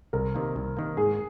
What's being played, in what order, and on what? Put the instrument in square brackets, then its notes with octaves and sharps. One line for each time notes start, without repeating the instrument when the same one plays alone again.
[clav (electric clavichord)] C2 [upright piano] A#4
[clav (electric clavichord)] C3 D#3 A#3
C2
C3 D#3 A#3
[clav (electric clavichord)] G#2 [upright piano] G#4